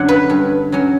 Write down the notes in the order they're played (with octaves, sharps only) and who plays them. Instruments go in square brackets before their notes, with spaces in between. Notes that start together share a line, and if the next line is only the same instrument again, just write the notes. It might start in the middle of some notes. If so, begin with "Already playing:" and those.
Already playing: [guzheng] F#2 D3 F#3 F#5
B4
G2
F#3 C#4